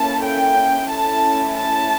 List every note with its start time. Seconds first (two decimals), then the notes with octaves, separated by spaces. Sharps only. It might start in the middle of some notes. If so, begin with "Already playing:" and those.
Already playing: A#3 C#4 E4 A4 A5
0.22 G5
0.88 A3 C#4 E4 A5
1.54 A5